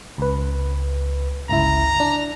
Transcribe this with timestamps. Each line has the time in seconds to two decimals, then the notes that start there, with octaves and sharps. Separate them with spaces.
0.18 C#2 B4
1.49 G1 C#2 E4 A#5
2.00 D4